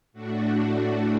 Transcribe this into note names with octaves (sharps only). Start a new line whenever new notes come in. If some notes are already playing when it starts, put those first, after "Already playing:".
A2 A3 D4 F#4